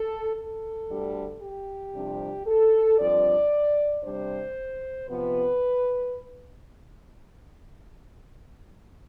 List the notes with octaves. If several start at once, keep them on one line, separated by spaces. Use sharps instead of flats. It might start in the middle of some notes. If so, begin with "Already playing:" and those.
Already playing: A4
A4
D2 D3 G3
G4
F2 C3 G3 D4
A4
G2 F3 C4 D5
C3 G3 D4 C5
C3 F3 B3 B4